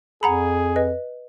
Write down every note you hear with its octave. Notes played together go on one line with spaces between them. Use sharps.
F2 G#4 F#5 A#5 B5
B4 D#5